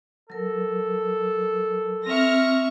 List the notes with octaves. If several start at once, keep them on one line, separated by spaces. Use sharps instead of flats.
F#3 A4 A#4
C4 E5 C#6 F6 A#6